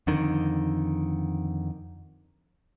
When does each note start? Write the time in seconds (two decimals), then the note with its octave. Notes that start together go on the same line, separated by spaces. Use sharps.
0.07 F2 D3 D#3